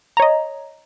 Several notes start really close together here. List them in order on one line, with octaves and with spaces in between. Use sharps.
A#5 C#5 D#5